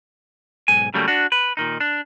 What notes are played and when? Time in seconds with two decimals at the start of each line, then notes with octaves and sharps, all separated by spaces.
0.68 B1 G#2 G#5
0.94 C#3 F#3 G3 A3 A#3
1.08 D4 F#4
1.32 B4
1.57 A#2 D#3 D#4
1.80 D4